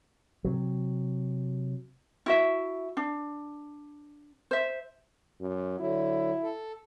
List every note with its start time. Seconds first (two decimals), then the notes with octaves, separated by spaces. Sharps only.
0.44 C3 F#3
2.26 E4 F#4 E5
2.97 D4
4.51 C5 E5
5.40 F#2
5.79 D3 F#3 E4
6.43 A4